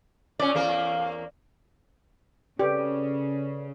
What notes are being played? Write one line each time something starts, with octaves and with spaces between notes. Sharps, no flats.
A#2 C#4 D5
E2 A#3 A#4 F5
C#3 G4 A4 B4 D5